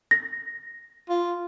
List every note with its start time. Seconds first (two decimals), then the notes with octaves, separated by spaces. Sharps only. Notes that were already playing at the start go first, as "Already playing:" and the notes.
0.11 A#6
1.09 F4